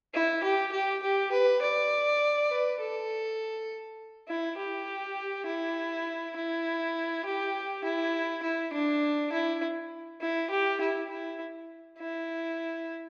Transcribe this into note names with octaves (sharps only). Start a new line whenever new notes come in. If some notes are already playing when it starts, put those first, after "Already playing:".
E4
G4
G4
G4
B4
D5
B4
A4
E4
G4
E4
E4
G4
E4
E4
D4
E4
E4
G4
E4
E4
E4